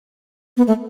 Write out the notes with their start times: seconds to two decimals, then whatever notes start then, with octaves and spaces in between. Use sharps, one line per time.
0.57 B3
0.67 A3